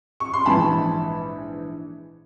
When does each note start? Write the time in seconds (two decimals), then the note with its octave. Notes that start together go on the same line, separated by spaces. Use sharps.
0.20 C#6
0.34 C6
0.45 A#1 G#2 E3 A5 B5